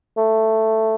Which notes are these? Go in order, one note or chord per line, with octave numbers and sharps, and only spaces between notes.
A3